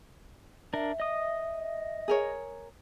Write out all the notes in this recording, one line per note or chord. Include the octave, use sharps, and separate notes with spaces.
D4 A#4 E5
D#5 D#6
G#4 A#4 C#5